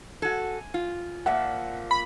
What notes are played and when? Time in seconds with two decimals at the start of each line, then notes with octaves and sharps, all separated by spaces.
0.22 F#4 A4 G#5
0.74 F4
1.26 A#2 F3 E5 F#5
1.91 B5